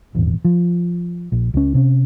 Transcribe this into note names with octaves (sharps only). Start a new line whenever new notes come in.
D#1 G#1 E2
F3
A#1
C#2 C#4
C3 C#4